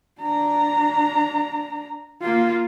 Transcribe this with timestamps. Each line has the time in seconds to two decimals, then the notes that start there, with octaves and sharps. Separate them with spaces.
0.21 D4 A#5
2.22 A#3 F4